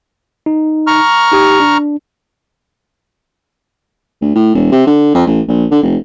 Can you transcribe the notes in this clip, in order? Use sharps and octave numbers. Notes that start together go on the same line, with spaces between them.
D#4
A#5 C#6 F6
D#4 G4 D#6
D4
D2
A2
E1
C3
D3
F2
A1
A#1
D3
F1